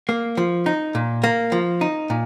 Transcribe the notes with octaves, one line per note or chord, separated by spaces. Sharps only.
A#3
F3
D#4
A#2
A#3
F3
D#4
A#2